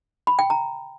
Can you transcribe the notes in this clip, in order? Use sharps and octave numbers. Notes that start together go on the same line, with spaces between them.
B5
G5
A#5